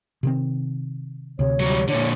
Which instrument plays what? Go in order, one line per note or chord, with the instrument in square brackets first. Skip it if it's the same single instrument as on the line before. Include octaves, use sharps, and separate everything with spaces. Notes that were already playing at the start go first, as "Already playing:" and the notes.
[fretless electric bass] C3 D#3 C4
[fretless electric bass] D2 C3 [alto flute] C#5
[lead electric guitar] F#3 G3
[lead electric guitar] A#2 D3 [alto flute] C#5